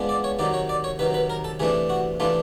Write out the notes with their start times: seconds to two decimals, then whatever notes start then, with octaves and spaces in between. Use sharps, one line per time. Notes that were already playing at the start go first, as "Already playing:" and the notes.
Already playing: F3 G#3 B3 D4
0.09 D5
0.24 C#5
0.39 C3 D#3 F#3 D5
0.54 C#5
0.69 D5
0.84 C#5
0.99 C3 D#3 F#3 B4
1.14 B4
1.30 A#4
1.44 A4
1.60 C3 E3 A3 D4 G#4
1.90 F#4
2.20 C3 E3 A3 D4 F4